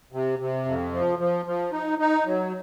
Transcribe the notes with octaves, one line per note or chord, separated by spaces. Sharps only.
C3
C3
F2
F3
F3
F3
D#4
D#4
F#3